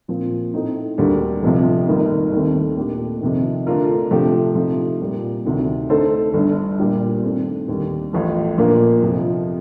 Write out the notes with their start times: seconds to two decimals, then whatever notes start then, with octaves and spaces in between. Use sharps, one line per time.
0.08 A#2 F3 C4
0.54 A2 A3 C4 D#4
0.98 D2 D3 G3 A#3 D4
1.42 F1 F2 C3 F3
1.87 G1 G2 D#3 A#3 D#4
2.32 D#2 D#3 A3 C4
2.76 A#2 A3 D4 G4
3.21 F2 C3 D#3
3.67 D3 A3 D4 F4 A#4
4.11 C3 F3 A3 D4 G4
4.55 C3 F3 A3 D#4
5.00 A#2 G3 A#3 F4
5.45 D2 C3 D#3
5.89 D3 A3 D#4 A4 C5
6.34 G1 G2 D3
6.79 A#2 G3 D4 G4
7.24 G2 D#3 A3 C4
7.68 D#2 D3 G3
8.13 A1 A2 F3
8.58 A#2 F3 A#3 D4
9.03 F2 C3 F3